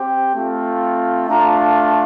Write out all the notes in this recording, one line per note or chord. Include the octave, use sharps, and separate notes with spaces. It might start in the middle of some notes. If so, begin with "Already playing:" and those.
Already playing: C4 G4
A3 C4 F4
A3 D4 F4 A#5